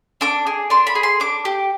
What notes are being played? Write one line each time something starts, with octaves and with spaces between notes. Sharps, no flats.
D4 D6
G#4
D4 C6
B5
G#4
C6
D4 D6
G4